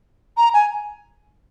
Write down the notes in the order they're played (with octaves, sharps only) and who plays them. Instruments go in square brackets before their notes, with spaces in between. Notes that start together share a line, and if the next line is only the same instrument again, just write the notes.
[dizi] A#5
G#5